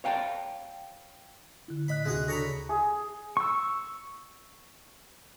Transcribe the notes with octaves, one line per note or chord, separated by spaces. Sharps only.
C#5 F5 G5 A5
D3 E4
A2 D#5 B5 F#6
D2 C3 G#3 F#4 G#4 F#6
C#3 D4 A4 C#5 A#5 B5 A#6
G#4
C#6 E6